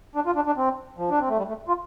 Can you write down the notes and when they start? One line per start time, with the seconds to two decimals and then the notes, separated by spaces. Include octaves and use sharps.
0.15 D4
0.26 F4
0.36 D4
0.47 D4
0.57 C4
0.98 F3
1.10 D4
1.20 C4
1.29 A3
1.38 G3
1.48 A3
1.68 F4